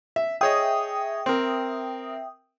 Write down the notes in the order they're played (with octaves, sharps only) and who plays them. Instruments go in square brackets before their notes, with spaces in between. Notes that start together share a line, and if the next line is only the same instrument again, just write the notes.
[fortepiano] E5
[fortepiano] G#4 C#5 D#5 [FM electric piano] E5 G5 D#6
[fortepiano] C4 A#4